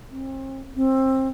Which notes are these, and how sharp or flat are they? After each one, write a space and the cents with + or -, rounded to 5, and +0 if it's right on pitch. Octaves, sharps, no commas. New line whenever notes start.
C4 +40
C4 +20